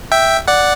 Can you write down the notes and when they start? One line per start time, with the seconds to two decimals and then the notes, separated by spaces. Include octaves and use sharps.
0.12 E5 G5
0.48 D5 F#5